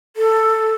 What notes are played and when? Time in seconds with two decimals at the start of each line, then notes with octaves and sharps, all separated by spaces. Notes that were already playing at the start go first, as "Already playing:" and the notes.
0.16 A4